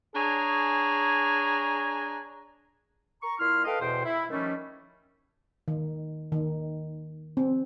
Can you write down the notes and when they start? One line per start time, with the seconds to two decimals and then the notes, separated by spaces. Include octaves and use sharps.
0.15 D4 G#4 C#5 G#5 A#5
3.22 A#5 C#6
3.39 A#2 E4 C6 F6
3.65 A4 B4 D#5 F5 G5
3.80 E2 B2 C5 G5
4.05 E4
4.30 D#3 F3 G3 A3 C#4
5.68 D#3
6.32 D#3
7.37 C4